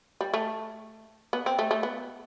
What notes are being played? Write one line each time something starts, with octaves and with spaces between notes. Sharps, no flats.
G3
A3
B3
C4
A3
A3
B3